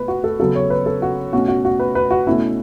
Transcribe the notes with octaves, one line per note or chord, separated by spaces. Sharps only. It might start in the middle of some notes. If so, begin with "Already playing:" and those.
Already playing: B2 A3 B4
F#4
A4
C#3 F#3 B3 A4
C#5
B4
A4
F#4
B2 A3 C#4 F#4
F#4
F#4
B4
B4
F#4
B2 A3 C#4 E4